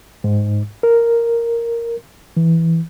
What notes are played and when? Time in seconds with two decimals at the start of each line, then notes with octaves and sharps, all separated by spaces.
0.24 G#2
0.83 A#4
2.37 E3